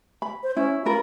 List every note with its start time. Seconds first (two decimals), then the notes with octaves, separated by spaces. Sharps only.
0.22 B5
0.43 C5
0.57 C#4 E4
0.85 C#4 F4 A#4 B5